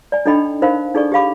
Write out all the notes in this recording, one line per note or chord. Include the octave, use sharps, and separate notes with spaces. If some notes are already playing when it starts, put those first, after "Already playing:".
D5 G#5
D4 D#4 A4 D#5 G5 B5
D#4 A#4 C5 F5 B5
D4 D#4 G#4 A4 D5 C#6
G4 G#4 F5 B5 D6